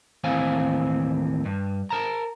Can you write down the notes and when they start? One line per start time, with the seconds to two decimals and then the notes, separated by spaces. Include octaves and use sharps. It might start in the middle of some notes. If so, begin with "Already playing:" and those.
0.24 D#2 A2 E3 C4 F5 G#5
1.45 G2
1.90 A#4 A5 A#5